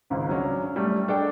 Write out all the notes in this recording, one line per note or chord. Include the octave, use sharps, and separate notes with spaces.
G#1 C#2 G#2
F#3 C#4 D4
G3 A3 D5
D4 A4 D5 G5